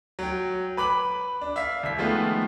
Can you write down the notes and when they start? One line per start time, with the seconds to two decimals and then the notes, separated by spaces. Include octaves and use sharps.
0.19 F#3 G5
0.77 B4 B5 D6 F#7
1.41 D4
1.56 E5 F5 B6
1.83 C2 B6
1.98 D#3 F3 G#3 A3 B3 F4